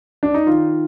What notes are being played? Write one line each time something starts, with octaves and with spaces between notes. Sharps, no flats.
D4
D#4
D#3 F4